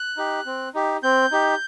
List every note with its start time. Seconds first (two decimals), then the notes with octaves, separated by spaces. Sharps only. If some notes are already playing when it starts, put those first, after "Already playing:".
Already playing: F#6
0.17 D#4 G4
0.46 C4
0.74 D#4 G4
1.03 C4 G6
1.32 D#4 G4